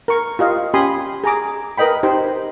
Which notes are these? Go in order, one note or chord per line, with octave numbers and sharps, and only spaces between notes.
A#4 C#6
F4 G4 D#5 F5
C#4 G4 G#5 B5 C6 D#6
G#4 A#5 D6
A#4 B4 D#5 G5 B5
D#4 G4 C5 G5